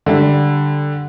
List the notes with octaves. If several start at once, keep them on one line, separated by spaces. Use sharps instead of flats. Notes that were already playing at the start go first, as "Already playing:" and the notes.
D3 G3